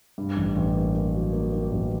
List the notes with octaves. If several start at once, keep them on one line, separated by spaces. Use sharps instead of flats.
G2
A1
A1
A#3
A#3
F#3
A#3
A#3
A1